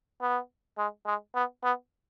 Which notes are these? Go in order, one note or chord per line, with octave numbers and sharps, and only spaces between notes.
B3
G#3
G#3
B3
B3